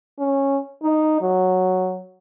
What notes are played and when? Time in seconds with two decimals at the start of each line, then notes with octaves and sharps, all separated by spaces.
0.19 C#4
0.83 D#4
1.22 F#3